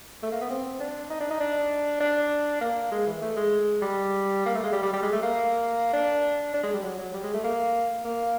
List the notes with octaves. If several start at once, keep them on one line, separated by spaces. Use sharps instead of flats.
A3
A#3
B3
C4
D4
D#4
D4
D#4
D4
D4
A#3
G#3
E3
A3
G#3
G3
A#3
A3
G#3
G3
G3
G3
G#3
A3
A#3
D4
D4
G#3
G3
F#3
F#3
G3
G#3
A3
A#3
A#3